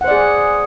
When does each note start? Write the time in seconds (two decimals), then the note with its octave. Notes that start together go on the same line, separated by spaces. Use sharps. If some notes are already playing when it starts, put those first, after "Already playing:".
0.01 F#5
0.04 C5
0.08 D5
0.11 G#4